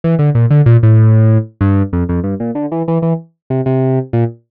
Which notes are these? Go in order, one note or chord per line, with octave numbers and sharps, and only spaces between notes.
E3
D3
A#2
D3
A#2
A2
G2
F2
F2
G2
A#2
D3
E3
E3
E3
C3
C3
A#2